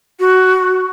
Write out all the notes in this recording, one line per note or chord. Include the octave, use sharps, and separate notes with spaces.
F#4